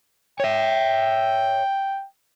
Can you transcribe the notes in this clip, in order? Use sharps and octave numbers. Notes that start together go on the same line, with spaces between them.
C#5 E5 G5